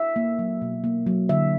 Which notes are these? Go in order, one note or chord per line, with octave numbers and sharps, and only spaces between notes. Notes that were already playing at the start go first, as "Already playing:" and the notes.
Already playing: E5
A#3
F#3
B2
A#3
F#3
D3 E5